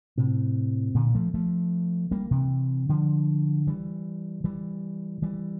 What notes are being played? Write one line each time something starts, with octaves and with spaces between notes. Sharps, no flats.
A2 C3
A#2 D3
F3 A3
F3 A3
G3 A#3
C3 E3
D3 F3
E3 G3
E3 G3
E3 G3